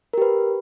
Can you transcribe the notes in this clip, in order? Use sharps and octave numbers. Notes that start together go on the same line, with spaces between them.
G4 A#4 B4